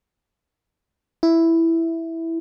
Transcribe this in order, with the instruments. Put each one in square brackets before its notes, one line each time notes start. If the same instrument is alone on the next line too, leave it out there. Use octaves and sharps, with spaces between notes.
[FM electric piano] E4